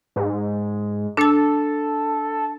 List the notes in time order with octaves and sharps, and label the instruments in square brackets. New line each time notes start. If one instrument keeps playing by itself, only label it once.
[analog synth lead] G#2
[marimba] D4 A5 [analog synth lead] A4